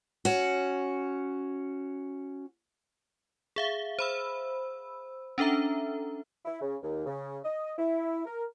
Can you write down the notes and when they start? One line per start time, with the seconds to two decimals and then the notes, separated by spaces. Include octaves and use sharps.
0.25 C#4 F#4
3.56 G#4 E5 F5
3.99 C5 B5 E6
5.38 C#4 D4 A4 E5 A#5
6.45 E4
6.60 C#3
6.82 D#2
7.06 C#3
7.44 D#5
7.78 E4
8.26 A#4